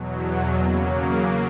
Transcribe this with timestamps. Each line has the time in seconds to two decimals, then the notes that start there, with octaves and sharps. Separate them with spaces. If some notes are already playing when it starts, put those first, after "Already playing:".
Already playing: E2 B2 F#3
0.58 C#3 F#3 A#3